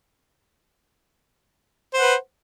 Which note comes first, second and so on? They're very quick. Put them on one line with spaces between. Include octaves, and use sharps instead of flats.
C5 F#5 B4